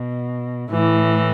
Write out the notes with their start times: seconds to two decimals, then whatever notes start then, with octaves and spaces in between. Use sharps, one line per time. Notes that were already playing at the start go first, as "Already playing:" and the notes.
Already playing: B2
0.70 A2 E3